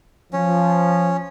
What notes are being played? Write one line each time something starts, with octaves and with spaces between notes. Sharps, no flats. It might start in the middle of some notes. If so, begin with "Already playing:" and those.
F3 C#4